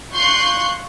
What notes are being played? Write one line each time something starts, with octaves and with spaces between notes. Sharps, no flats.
F4 C6 C#6 F#6 G6